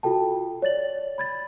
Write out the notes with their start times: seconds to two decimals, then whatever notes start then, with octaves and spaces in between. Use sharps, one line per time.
0.03 F4 F#4 A4 G5 A5
0.62 C#5 D5 A6 F#7
1.18 B5 G#6 A6